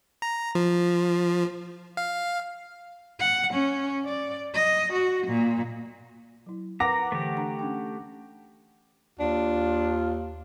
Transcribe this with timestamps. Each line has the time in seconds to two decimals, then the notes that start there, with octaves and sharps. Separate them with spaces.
0.22 A#5
0.55 F3
1.97 F5
3.20 F#5
3.53 C#4
4.05 D5
4.54 D#5
4.93 F#4
5.27 A#2
6.46 F#3 E4
6.80 A#4 B4 F#5 A#5 D6 A#6
7.12 D3 E3 A3 G4
7.37 D4 A#5
7.59 C#4 D4 G5
9.20 D#2 D4 F4